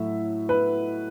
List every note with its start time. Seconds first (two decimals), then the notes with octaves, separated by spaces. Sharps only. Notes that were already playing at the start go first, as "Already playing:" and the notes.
Already playing: A2 F#3 A3 E5
0.49 B4